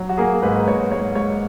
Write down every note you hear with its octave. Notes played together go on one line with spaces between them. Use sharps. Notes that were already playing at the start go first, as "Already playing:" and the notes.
Already playing: F#3
F#4
A#3 G#4
G#2 B4
G#2 C#5
G#2 C#5
G#2 C#5